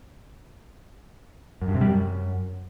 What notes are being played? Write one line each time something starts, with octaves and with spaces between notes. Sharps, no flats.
F#2
G2
C3
G3
F#2